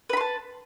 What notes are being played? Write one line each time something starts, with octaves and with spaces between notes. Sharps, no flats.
B4 A5 B5 C6